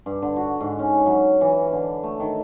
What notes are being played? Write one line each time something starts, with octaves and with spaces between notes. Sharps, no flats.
G2
D3
F#4
G#2
C#4
F#3
E3
D3
A3
D#3